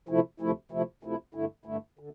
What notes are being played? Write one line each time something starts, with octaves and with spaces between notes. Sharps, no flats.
D2 C3 F3 A3 E4
D2 C3 F3 A3 E4
D2 C3 F3 A3 E4
D2 C3 F3 A3 E4
G2 D3 A3 E4
G2 D3 A3 E4
D3